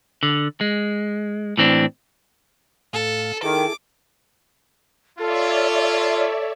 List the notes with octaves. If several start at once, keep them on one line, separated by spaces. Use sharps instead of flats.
D3
G#3
A2 E3 C4 D4
A2 A4 F5
D#3 E4 G#4 A4 D6
F4 A4 C#5 D5 E5